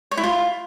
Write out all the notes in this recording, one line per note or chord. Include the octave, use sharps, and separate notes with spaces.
C#5
E4
F4